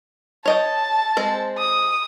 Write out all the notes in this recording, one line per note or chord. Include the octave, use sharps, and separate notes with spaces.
C#5 D#5 G5 A5
G#3 C4 C5
D#6